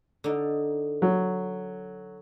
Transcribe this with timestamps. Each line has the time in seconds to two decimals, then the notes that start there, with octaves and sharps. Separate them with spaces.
0.24 D3 D#4
1.02 F#3